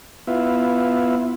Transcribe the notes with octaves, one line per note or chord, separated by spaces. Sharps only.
B3 E4 F4